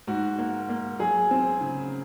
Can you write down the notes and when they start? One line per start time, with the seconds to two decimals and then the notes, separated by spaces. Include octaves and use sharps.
0.07 G#2 F#4
0.39 A#3
0.69 A#3
0.99 F#3 G#4
1.31 C4
1.61 C#3